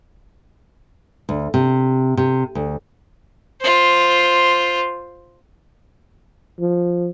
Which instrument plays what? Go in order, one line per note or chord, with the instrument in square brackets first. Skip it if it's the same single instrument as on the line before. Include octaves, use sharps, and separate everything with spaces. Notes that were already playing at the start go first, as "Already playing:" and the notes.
[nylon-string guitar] D2
C3
C3
D2
[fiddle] F4 C5
[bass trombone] F3